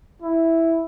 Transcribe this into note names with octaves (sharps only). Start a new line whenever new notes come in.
E4